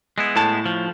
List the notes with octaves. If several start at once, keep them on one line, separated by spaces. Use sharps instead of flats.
G#3 B3 E4
A2 A5
F3